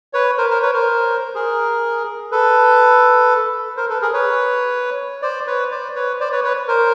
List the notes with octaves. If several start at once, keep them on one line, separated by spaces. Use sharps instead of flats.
B4 C#5
A#4 C5
A#4 C5
B4 C#5
A#4 C5
G#4 A#4
A4 B4
A#4 C5
A4 B4
G#4 A#4
B4 C#5
C5 D5
B4 C#5
C5 D5
B4 C#5
C5 D5
B4 C#5
B4 C#5
A#4 C5